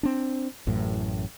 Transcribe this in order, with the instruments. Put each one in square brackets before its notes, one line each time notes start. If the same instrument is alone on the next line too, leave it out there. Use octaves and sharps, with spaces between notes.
[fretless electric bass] C4 D4
A1 F#2 A2